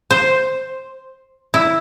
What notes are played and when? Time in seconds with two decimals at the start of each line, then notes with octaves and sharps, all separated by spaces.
0.10 C5
1.54 E4